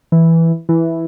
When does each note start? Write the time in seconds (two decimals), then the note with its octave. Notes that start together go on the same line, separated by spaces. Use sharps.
0.12 E3
0.69 E3